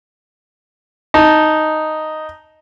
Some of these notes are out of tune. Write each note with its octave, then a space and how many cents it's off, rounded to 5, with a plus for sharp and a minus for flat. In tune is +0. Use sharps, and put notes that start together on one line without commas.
D#4 +0 A5 +0